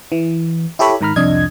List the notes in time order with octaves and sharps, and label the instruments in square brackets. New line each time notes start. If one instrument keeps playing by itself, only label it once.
[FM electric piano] E3
E4 G4 A4 C#5 B5
G#2 D#3 A#5 B5 F6
C2 F2 D4 D#5 G#6